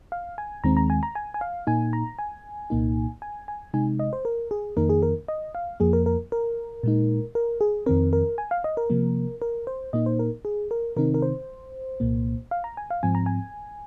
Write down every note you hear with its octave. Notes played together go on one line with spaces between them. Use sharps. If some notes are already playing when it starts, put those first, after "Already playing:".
F5
G#5
D#2 D#3 G#3 C4 A#5
A#5
G#5
A#5
G#5
G#5
F5
A#2 A#3 D#4 G#5
A#5
G#5
C2 A#2 A#3 D#4
G#5
G#5
C3 G#3 D#4 G#5
D#5
C5
A#4
G#4
F2 D#3 A#3 D#4 A#4
G#4
A#4
D#5
F5
F2 F3 A#3 G#4
A#4
A#4
A#4
A#2 G#3 D#4
A#4
G#4
F2 D#3 C4 A#4
A#4
G#5
F5
D#5
A#4
C3 F3 A#3
A#4
C5
A#2 A#3 D#4 D#5
C5
A#4
G#4
A#4
C3 D#3 C4 D#4 A#4
A#4
C5
C2 A#2 A#3
F5
A#5
G#5
F5
G#2 F3 C4 G#5
A#5
G#5